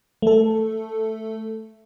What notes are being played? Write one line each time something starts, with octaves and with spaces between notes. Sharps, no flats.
A3 A4